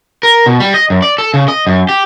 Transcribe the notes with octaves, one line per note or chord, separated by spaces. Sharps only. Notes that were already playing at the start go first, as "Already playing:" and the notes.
A#4
B2
G3
D#5
F#2
D5
A4
C#3
D#5
F#2
G4